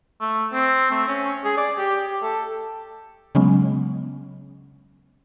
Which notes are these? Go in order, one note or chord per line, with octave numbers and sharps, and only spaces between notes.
A3
C4
A3
C#4
G#4
D5
G4
A4
C#3 F#3 G#3 B3 C#4